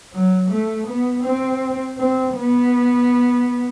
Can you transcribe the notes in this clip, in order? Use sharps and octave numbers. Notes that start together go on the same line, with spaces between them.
F#3
A3
B3
C4
C4
B3